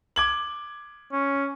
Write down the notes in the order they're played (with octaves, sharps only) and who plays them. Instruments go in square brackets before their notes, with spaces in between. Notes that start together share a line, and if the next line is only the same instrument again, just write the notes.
[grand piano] D6 G#6 F#7
[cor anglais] C#4